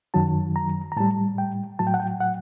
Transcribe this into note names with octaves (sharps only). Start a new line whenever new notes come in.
F#2 D#3 F#3 A5
A#5
A#5
A2 G3 A5
G5
A2 F#3 A5
G5
F#5
G5
F#5